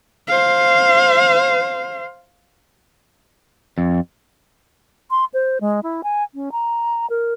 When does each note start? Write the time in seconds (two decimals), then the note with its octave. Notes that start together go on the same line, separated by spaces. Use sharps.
0.27 C5 F5
3.78 F2
5.11 C6
5.34 C5
5.61 G#3
5.83 E4
6.04 G#5
6.35 C#4
6.52 A#5
7.10 A#4